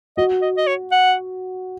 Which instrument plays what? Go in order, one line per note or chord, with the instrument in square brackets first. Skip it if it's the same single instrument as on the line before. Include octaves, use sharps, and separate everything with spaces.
[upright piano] F#4 [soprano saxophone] D#5
[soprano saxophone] D#5
D#5
C#5
F#5